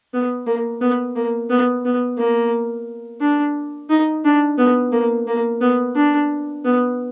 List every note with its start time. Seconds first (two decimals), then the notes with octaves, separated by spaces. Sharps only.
0.14 B3
0.47 A#3
0.81 B3
1.16 A#3
1.50 B3
1.85 B3
2.18 A#3
3.21 D4
3.90 D#4
4.25 D4
4.58 B3
4.92 A#3
5.27 A#3
5.61 B3
5.96 D4
6.65 B3